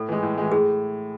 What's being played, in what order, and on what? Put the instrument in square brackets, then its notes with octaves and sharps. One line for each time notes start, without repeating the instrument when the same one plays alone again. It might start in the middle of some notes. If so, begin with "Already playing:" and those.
Already playing: [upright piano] A2 [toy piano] A4
[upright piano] E3 G#3
A2
E3 G#3
[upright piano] A2 [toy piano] G#4